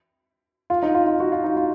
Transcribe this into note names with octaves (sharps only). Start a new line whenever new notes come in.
F4
D#4
F4
F4
F#4
F4
D#4
F4